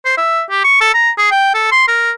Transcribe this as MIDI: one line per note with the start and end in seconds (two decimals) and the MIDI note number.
0.05 0.14 72
0.18 0.42 76
0.50 0.64 67
0.64 0.78 85
0.81 0.93 69
0.94 1.10 82
1.18 1.31 68
1.31 1.53 79
1.54 1.67 69
1.72 1.85 84
1.88 2.11 70